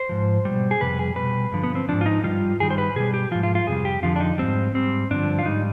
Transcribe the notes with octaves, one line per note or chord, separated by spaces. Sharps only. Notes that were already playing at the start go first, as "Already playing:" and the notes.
Already playing: C5
G#2 F3
B2 G3
G#4
F2 C3 G3 B4
G#4
B2 G3 B4
G2 D3 F3
B3
C4
G#2 F3 D4
F4
D#4
G2 D#3 G3 F4
G2 D#3 G3 G#4
C5
B4
B2 G3 G#4
G4
G#2 F3 F4
F4
F4
F2 C3 G3 G#4
G4
F2 D3 F3 F4
D4
D#4
G#2 G3 C4
G#2 G3 C4
G2 D3 F3 D4
F4
G#2 G3 D#4